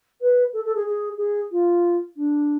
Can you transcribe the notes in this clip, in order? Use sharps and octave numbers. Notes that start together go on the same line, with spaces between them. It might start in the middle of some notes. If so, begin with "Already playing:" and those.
B4
A4
A4
G#4
G#4
G#4
F4
D4